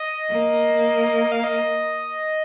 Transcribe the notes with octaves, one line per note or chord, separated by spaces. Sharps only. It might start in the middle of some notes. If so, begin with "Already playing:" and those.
Already playing: D#5
A#3
F5
D#5